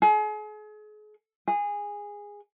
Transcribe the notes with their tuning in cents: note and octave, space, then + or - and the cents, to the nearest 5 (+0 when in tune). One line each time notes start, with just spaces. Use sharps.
G#4 +40
G#4 -15